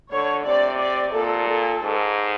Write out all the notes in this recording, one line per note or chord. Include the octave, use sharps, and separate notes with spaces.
D3 C#5
C3 D5
D5
A#2 A4
A4
G#2